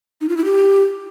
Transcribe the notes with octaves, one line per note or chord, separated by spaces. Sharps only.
D#4
F4
E4
G4